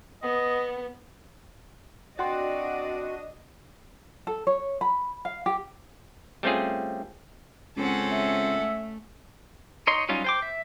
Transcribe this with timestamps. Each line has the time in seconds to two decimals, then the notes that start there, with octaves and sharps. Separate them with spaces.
0.22 B3 D#5
2.19 C4 D4 F#4 D5 D#5 G5 C6
4.27 A4
4.47 C#5
4.81 B5
5.25 F5
5.46 G4
6.43 G3 A3 C4 C#4 F4 G#4
7.77 C#2 C4 C#4 A4 F#5
8.12 E5
8.60 A3
9.87 D#4 C#5 D#5 C6
10.09 F#3 G3 C#4 D#4 F4
10.24 C5 G5 D6
10.42 E5